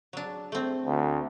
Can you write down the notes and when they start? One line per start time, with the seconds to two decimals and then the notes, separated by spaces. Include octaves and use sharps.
0.13 F#3 D4
0.52 A3 C4
0.86 D2